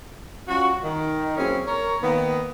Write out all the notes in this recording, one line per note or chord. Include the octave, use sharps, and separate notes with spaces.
G3 C#4 F4 F#4
D#3
F#3 A#3 C4 C#4 E4 G#4
A#4 C#5
D#3 A#3 B3